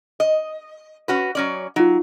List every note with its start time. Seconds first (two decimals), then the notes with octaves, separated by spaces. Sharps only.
0.20 D#5
1.08 C#4 F#4 B4
1.35 F#3 C#4 D5
1.76 F#3 D#4 F4